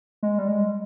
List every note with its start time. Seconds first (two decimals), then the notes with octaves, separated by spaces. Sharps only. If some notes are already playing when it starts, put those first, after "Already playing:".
0.23 G#3
0.38 G3
0.48 G#3